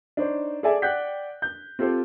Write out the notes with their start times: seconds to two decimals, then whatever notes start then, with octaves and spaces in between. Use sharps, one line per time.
0.17 D4 D#4 C5 C#5
0.63 G#4 A4 D5 E5 G#5
0.82 D5 F#5 G5 F#6 G6 B6
1.42 G6
1.79 C4 F4 G4 A4 C5